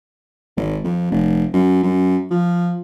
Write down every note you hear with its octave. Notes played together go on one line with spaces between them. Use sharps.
G#1
F2
F1
F#2
F#2
F3